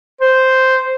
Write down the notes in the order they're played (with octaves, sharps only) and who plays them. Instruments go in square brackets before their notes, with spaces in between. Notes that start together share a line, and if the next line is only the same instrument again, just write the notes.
[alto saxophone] C5